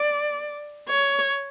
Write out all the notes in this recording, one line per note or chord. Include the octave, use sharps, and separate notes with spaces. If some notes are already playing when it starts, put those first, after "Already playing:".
Already playing: D5
C#5